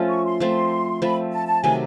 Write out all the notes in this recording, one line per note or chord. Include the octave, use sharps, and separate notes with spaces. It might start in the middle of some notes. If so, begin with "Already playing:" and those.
Already playing: F3 A3 C#4 F4
C#6
C6
F3 A3 C4
F3 A3 C4 B5
A5
A5
C3 D#3 F#3 A3 G#5